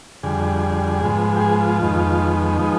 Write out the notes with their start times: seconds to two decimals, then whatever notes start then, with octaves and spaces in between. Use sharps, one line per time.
0.23 F2 D3 G3 G#4
1.01 G#2 F3 G#3 B3
1.36 G4
1.41 G#4
1.60 F4
1.80 F2 D#3 G#3 B3
2.59 F3 G#3 B3 D#4